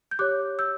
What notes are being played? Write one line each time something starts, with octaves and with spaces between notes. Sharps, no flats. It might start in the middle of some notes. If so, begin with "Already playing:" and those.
G6
G4 C#5 D6 F#6
E6 G6